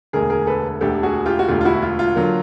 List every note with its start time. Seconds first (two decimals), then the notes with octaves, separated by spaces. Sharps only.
0.13 E1 D2 D3 G#4 A#4
0.30 G#4 A#4
0.47 A4 B4
0.81 E1 D2 D3 G4 A4
1.03 F#4 G#4
1.26 F4 G4
1.39 F#4
1.48 E1 D2 D3 F4 G4
1.61 F4
1.65 E4 F#4
1.82 F4
1.99 F4
2.16 D3 F#3 A#3